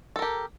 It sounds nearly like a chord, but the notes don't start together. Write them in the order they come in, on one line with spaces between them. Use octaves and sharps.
A4 A#4 G4